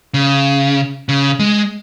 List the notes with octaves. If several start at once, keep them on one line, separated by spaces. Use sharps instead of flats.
C#3
C#3
G#3